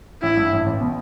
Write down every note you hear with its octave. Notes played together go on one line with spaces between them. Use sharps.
A1 E4
G2
A1
A1
B2